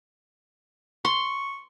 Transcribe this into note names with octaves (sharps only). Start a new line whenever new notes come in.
C6 C#6